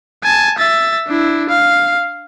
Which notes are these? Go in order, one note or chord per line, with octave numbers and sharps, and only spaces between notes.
G#5 A5
E5 A6
D4 E4
F5